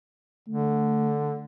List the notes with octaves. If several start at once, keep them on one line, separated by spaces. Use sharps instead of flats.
D3 A3